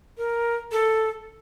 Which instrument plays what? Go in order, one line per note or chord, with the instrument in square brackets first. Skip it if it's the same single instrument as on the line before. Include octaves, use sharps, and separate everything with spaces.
[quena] A#4
A4